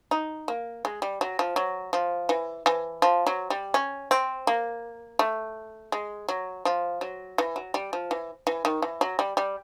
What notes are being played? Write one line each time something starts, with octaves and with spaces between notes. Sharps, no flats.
D#4
A#3
G#3
G3
F#3
F3
F#3
F3
E3
E3
F3
F#3
G3
C#4
C4
A#3
A3
G#3
F#3
F3
F#3
E3
F#3
G3
F3
E3
E3
D#3
E3
F#3
G3
G3